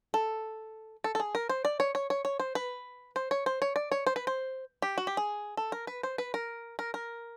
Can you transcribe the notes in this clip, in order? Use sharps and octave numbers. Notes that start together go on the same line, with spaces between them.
A4
A4
A4
G#4
A#4
C5
D5
C#5
C#5
C#5
C#5
C5
B4
C5
C#5
C5
C#5
D5
C#5
C5
B4
C5
G4
F#4
G4
G#4
A4
A#4
B4
C5
B4
A#4
A#4
A#4